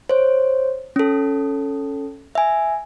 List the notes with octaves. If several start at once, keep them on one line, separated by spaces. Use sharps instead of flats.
C5 C#5
C#4 A4
E5 G#5